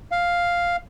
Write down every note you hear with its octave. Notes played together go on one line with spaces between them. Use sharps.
F5